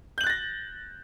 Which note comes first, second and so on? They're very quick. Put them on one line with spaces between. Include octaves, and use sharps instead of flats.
G6 F#7 F#6 A6 A#6